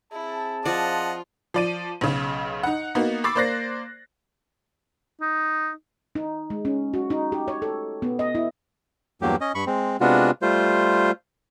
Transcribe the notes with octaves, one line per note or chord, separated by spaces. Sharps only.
C4 E4 G#4 A5
F3 F4 D5 D#5 F#5
F3 D5 D#7
B1 C#3
D#4 F#5
A#3 B3 D#4 F#4
B5 C#6 D6 E6 A6 C7
A#3 C5 D5 F#6 A#6 C7
D#4
D#4
G#3
C#4
F#4
D#4
G4
C#5
A4
B3
D#5
E4
E2 G2 F#3 A#3 G4
C#4 D#5
G2 B5 C#6
G#3 C4
C3 G#3 B3 D4 F4 F#4
G3 A3 F4 C5